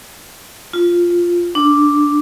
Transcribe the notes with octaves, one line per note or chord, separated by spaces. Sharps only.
F4
D4